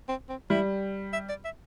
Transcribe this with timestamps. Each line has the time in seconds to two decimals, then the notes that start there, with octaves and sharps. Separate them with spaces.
0.09 C4
0.29 C4
0.50 G3 E4
1.13 E5
1.29 D5
1.45 E5